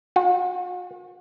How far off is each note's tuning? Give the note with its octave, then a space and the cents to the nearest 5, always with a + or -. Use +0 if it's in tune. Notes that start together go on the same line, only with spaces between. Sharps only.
F#4 -45